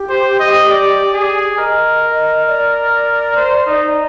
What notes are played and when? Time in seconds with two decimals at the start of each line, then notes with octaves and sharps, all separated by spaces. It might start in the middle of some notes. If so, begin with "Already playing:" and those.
Already playing: G4
0.10 C5
0.40 D#5
0.69 D5
1.14 G#4
1.58 A#4 D#5
2.02 D#5
2.48 D5
3.36 C5
3.66 D#4